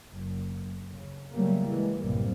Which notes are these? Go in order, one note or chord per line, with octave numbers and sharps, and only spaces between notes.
F#1
C#3
C#3 F#3 G3 A3 A#3
E3 G#3
A1 F#2 C3 G3 A#3